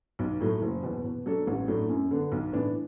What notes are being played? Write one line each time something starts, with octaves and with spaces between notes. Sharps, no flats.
B1
A2 F#3 A3
F#1
E2 B2
B2
F#3 D4 A4
A1
A2 F#3 A3 D4
F#2
D3 B3 D4
B1
A2 E3 B3 D4